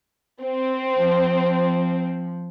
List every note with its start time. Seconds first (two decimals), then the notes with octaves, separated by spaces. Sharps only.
0.45 C4
0.96 F3